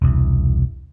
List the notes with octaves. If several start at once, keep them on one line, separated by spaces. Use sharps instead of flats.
E1 C2